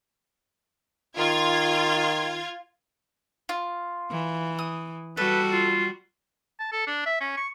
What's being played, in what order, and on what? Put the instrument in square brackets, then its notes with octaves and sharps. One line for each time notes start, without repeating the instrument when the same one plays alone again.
[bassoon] D#3 [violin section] F4 G#6
[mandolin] F4
[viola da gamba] E3
[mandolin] D#6
[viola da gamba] G3 F#4 [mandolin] A4 [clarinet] B4
[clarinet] F4
[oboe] A5
A4
D4
E5
C#4
C#6